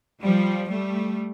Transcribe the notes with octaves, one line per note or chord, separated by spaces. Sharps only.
F3 G3
G3 A3